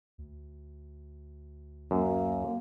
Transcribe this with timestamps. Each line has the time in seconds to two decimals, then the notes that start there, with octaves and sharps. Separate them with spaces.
0.18 D2
1.91 F#2 A#3